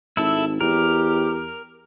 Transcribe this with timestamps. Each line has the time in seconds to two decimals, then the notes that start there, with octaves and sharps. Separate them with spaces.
0.17 G#1 E4 A4 E5
0.61 E2 G4 A#4